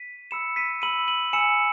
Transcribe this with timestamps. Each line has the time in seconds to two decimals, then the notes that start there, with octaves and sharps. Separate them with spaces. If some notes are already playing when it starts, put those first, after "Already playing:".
Already playing: B6 D#7
0.31 B5 E6 C#7 E7
0.56 B6 D#7
0.82 B5 E6 D#7 F#7
1.08 D#7 F#7
1.33 G#5 B5 E6 C#7 E7